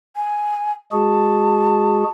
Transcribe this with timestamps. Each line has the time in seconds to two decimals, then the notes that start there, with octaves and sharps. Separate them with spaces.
0.16 G#5
0.92 G#3 F#4 G#4 A5